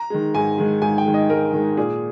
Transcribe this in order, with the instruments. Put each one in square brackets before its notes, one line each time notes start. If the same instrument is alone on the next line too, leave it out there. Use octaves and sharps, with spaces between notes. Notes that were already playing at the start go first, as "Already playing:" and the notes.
Already playing: [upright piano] A#5
D#3 G#3
G#2 G#5
D#3 G#3
G#2 G#5
G5
D#3 G#3
D#5
G#2 A#4
D#3 G#3
A#2 G#4